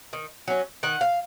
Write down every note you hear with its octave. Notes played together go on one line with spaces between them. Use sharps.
D#3
F#3 C#4
D#3 F#5
F5